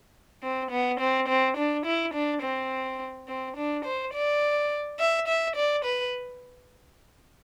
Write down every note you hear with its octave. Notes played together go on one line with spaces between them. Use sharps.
C4
B3
C4
C4
D4
E4
D4
C4
C4
D4
C5
D5
E5
E5
D5
B4